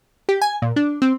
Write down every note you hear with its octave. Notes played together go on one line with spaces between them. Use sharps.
G4
G#5
A#2
D4
C4